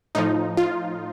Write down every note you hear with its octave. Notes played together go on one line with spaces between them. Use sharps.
A2 F3 D#4
F4